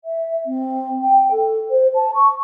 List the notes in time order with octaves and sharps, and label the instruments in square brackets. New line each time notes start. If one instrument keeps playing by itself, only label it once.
[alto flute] E5
C4
G5
A4
C5
A5
C#6